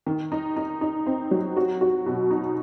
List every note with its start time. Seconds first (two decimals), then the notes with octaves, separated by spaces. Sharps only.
0.06 D#3
0.32 D#4
0.56 D#4
0.81 D#4
1.06 C4
1.31 F#3
1.57 F#4
1.81 F#4
2.06 B2
2.31 D#4